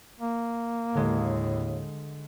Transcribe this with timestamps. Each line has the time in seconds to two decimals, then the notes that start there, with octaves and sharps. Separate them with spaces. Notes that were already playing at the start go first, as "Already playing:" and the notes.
0.19 A#3
0.94 D#2 A2 D3 G#3